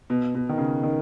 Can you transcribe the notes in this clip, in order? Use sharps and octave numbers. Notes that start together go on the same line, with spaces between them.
B2
B2
D#3
C#3
D#3